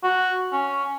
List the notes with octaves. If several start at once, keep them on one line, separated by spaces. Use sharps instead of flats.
F#4
C#4